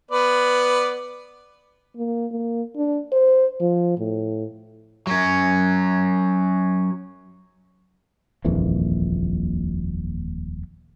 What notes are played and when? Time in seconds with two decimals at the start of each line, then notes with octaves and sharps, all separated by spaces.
0.11 B3 B4 D5
1.96 A#3
2.32 A#3
2.76 D4
3.12 C5
3.61 F3
3.98 A2
5.07 F#3 C#4
8.45 D#1 A#1 F2 E3